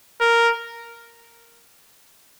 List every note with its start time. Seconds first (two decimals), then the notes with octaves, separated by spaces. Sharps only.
0.21 A#4